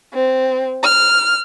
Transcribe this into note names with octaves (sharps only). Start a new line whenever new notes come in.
C4
F6